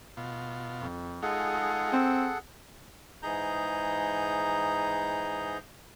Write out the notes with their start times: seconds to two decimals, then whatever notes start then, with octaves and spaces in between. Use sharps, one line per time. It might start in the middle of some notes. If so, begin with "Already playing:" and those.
0.17 B2 F4
0.80 F2
1.22 G#3 D#4 F4 G#4 A4 F#5
1.93 C4
3.22 G#2 E3 D#4 G#4 A#5 G6